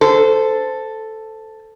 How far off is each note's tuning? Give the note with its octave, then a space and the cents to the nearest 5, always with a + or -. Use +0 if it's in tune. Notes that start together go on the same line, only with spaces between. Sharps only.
A4 +0 C5 -20